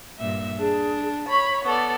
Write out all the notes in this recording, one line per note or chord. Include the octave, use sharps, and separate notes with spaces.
G2 A#2 E5
D4 G#4
C#5 B5 C#6
B3 A4 D5